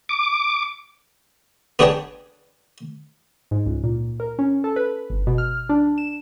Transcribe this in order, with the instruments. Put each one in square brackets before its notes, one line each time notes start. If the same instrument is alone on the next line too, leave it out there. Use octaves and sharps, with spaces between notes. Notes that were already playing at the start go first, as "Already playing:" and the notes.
[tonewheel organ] D6
[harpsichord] B3 D4 G#4 C#5 G5 A5
[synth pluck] G#2
C#2
A#2
A#4
C#4
A4
B4
G1
B2
F6
D4
E7